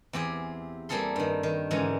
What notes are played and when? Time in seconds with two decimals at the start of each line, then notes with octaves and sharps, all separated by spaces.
0.13 E2 C4 G4 G#4
0.89 G3 A#3 C4 G#4 A4 C6
1.16 G2 D#3
1.43 D#3
1.71 G#2 D3 E3 G#3 C#4